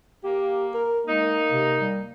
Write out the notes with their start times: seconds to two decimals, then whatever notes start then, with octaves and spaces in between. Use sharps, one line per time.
0.24 A#3 G4
0.74 A#4
1.07 G#3 A#3 D#4
1.51 C3
1.81 G3